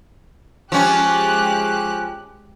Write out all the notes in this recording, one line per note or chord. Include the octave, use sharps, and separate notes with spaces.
F3 G#3 C#4 G4 F#6